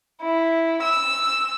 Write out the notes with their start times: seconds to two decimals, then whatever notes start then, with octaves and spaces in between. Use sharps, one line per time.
0.22 E4
0.82 E6